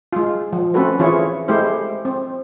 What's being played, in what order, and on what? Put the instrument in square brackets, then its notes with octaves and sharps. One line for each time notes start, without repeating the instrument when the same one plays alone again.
[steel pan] G#3 F4
F3
A3 C4 C#4 F#4 A4 B4
E3 E4 F4 G#4 C#5
G#3 A3 E4 G4 C5
C4